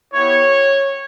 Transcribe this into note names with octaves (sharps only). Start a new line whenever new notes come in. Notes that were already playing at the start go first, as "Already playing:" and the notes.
B3 E4 G4 C#5